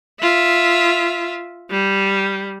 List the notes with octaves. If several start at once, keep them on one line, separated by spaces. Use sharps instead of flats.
F4 E5
G3